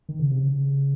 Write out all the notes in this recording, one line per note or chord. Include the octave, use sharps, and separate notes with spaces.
D#3
C#3
C3
C#3